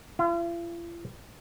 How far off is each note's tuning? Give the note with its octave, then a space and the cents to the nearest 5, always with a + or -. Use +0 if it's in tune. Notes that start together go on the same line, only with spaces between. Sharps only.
F4 -45